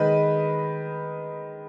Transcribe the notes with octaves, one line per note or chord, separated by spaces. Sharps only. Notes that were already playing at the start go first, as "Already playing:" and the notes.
Already playing: D#3 G#3 B4 D#5